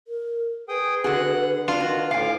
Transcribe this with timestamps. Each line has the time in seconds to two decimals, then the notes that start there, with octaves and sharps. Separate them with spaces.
0.08 A#4
0.69 G#4 B4 G5 D#6
1.04 D3 F#4 G#4 F#5 F#6
1.68 D4 F4
1.80 D#3 F#4
2.11 D2 A2 F5 G#5 D6